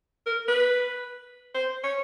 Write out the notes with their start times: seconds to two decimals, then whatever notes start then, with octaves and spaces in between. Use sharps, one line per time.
0.26 A#4
0.48 B4
1.54 C5
1.83 C#5